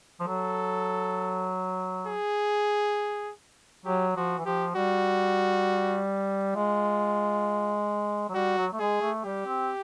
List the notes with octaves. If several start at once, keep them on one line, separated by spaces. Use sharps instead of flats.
F3
F#3 A4
G#4
F#3 G4
F3 F#4
E3
F3 G4
G3 F#4
G#3 F4
F#3
G3 F#4
F#3
A3
G#3 G#4
A3
G3 G4
C4